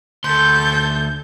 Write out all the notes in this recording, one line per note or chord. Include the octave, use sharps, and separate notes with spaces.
D2 A4 C6 G6